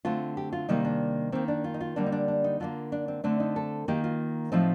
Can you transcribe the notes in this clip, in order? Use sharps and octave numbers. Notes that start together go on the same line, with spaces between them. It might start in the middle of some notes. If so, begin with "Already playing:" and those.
D3 A3 C4 F4
G4
F4
C3 D#3 G3 A#3 D#4
D4
D#3 A#3 C4
D4
F4
D#4
F4
D3 G3 A#3 D4
D#4
D4
D4
D#4
D3 G3 A#3 F4
D4
C4
D3 A3 C4 D4
D#4
A4
D#3 A#3 G4
F4
A2 F3 A3 C4 D#4